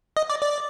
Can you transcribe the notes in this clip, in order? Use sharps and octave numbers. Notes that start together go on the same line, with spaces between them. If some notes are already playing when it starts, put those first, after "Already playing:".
D#5
D5
D5